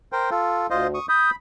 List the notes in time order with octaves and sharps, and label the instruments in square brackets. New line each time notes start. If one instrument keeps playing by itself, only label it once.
[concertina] A#4 C5 G5
F4 A4
[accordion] D2 [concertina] F4 C5 D#5
[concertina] C#6 D#6
[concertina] B5 [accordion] D#6 G6